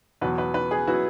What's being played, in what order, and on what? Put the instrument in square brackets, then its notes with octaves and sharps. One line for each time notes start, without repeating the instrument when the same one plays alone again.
[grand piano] E2 B2 F#3 [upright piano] B4
[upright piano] B4
B4
G#4
[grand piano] F#3 B3 E4 [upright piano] F#4